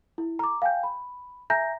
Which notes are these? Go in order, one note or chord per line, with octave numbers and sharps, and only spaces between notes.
E4
A#5 D6
F5 G5 G#5 G6
B5
E5 G#5 A#5 G6 A#6